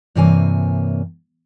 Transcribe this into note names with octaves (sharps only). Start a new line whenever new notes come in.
G2 C3 E3 A#3 C#5 G#5